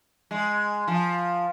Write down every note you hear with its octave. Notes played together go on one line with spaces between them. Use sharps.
G#3
F3